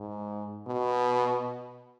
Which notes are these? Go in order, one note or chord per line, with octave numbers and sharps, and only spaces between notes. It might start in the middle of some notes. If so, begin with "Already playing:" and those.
Already playing: G#2
B2